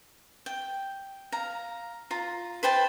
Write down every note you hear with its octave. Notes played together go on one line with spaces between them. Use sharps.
G5
F5 A#5
F4 A#5
B4 C5 G5 A5